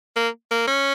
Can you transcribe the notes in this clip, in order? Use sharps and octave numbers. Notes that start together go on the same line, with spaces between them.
A#3
A#3
C#4